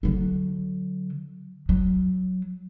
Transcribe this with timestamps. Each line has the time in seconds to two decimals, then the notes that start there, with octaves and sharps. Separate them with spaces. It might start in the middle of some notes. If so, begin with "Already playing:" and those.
0.03 D3 F#3
1.69 F#3